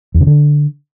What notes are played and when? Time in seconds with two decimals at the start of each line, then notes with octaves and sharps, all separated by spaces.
0.14 E2
0.21 C#3
0.27 D3